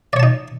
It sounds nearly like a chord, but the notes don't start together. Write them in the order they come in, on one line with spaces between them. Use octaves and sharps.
D5 C#5 A5 D#4